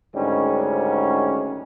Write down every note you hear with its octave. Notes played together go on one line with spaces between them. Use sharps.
D2 G#2 D#3 G3 C#4